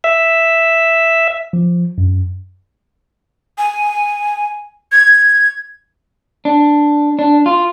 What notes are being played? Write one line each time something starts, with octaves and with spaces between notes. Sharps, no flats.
E5
F3
F#2
G#5
G#6
D4
D4
F4